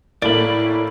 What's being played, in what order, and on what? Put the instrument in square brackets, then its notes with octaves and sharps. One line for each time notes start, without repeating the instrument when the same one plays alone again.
[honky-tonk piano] A2 A#3 [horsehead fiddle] E4 [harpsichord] A#4 [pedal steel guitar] D5 B5